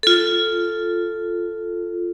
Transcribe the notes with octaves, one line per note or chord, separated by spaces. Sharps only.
F4 A4